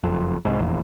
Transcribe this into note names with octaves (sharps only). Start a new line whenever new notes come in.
F#1 F2
C2 G#2
F1 A#1 E2